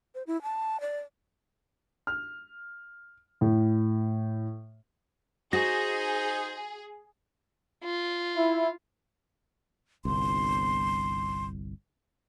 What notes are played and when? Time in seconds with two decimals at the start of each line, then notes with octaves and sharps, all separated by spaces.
0.15 C5
0.27 E4
0.42 A5
0.81 D5
2.07 F6
3.41 A2
5.53 D#4 F#4 G#4 C5 A#6
7.84 F4
8.36 E4
10.05 G1 C2 C6